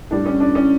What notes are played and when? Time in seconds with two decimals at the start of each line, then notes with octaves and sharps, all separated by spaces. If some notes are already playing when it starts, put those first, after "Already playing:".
0.11 A2 G3 D4
0.26 C#4
0.40 D4
0.55 C#4